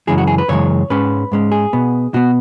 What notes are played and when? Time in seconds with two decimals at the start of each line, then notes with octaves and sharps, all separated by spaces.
0.07 F#2 C#3 E3 G#3 G#4
0.18 F#4
0.28 G#4
0.38 B4
0.49 F#2 C#3 E3 G#3 C#5
0.90 G#2 G#3 C#4 B4
1.32 G#2 G#3 C#4
1.52 G#4
1.73 B2 B3
2.14 B2 B3 F#4